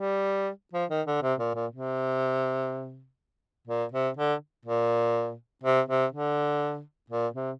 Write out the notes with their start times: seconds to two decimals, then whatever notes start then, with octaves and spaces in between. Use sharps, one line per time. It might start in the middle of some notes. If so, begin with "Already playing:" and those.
Already playing: G3
0.73 F3
0.90 D#3
1.07 D3
1.22 C3
1.39 A#2
1.55 A#2
1.71 C3
3.67 A#2
3.92 C3
4.17 D3
4.65 A#2
5.63 C3
5.88 C3
6.12 D3
7.10 A#2
7.34 C3